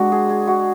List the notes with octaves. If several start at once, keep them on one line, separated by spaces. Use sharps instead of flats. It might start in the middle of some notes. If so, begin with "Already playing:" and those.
Already playing: G#3 D4 F#4
G#4
G#4
F#4